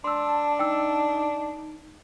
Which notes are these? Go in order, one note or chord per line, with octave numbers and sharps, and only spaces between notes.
D4 A5 C6 E6
D#4 G5 E6